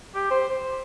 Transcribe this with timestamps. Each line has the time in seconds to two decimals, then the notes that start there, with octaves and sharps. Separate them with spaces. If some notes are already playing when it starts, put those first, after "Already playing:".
0.15 G4
0.31 C5